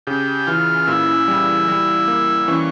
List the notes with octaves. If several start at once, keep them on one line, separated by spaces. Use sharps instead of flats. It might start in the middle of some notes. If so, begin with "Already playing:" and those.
C#3 G4
E3 F4
A#2 E4
G3
G3
A#3
E3 C#4